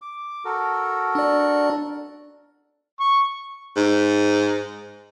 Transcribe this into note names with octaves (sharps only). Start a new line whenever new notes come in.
D6
F#4 A4 A#4
D4 D5
C#6
G#2